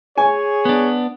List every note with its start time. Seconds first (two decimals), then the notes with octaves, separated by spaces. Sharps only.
0.18 G#4 C#5 G#5
0.65 B3 D4